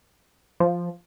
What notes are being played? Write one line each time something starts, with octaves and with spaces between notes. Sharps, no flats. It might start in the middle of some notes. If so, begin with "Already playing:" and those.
F3